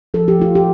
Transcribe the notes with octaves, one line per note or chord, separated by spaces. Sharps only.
F3 A4
G4
A3 F4
G4